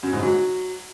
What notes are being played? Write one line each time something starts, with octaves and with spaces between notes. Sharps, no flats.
F#2
G#2
F#3